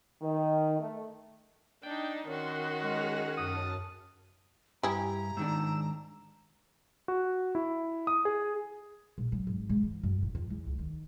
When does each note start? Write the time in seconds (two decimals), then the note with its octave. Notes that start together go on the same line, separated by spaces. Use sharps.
0.21 D#3
0.79 A3
1.83 D4 D#4 G5
2.28 D#3 C#4 F#4 C6
2.82 G#3 G#4 F6 A#6
3.38 F#2 A5 D#6 F6
4.83 G2 E4 G4 G#4 A#5
5.37 G#2 D#3 D4 E6
7.08 F#4
7.55 E4
8.07 D#6
8.25 G#4
9.18 A#1
9.32 F#3
9.47 G#1
9.69 G#2
9.83 E3
10.03 F#2
10.23 A1
10.35 F2
10.50 E2
10.66 C#2
10.79 D#3